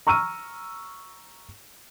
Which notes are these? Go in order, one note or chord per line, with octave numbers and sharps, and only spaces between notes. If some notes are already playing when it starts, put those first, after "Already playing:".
A#5 C#6 E6 F6 D#7